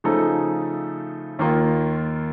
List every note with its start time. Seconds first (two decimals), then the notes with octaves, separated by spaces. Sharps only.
0.04 C#3 F3 A3 D#4 A4
1.39 D#2 D#3 A#3 F4